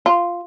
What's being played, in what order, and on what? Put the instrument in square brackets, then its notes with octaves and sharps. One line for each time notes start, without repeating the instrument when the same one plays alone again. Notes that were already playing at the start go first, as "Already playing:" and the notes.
[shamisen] F4